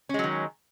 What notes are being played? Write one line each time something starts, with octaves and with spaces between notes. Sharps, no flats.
D#3 F#3 G#3 C#4